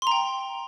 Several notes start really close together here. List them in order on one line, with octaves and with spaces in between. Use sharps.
C6 A#5 G5